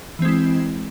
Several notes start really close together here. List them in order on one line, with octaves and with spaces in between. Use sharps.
E3 C4 G#3 E4